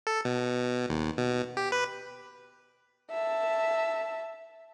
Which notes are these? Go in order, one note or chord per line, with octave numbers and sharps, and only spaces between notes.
A4
B2
D#2
B2
G4
B4
E5 A5